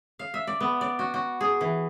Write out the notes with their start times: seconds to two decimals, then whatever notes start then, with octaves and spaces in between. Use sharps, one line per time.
0.19 F5
0.34 E5
0.47 D5
0.60 B3
0.81 D5
0.99 F#4
1.14 F#4
1.41 G#4
1.61 E3